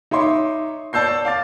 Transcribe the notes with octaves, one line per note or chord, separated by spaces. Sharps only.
D#4 C#5 E5 C6 D6
C#5 D5 A5 E6 G6 C7
F5 D6 A6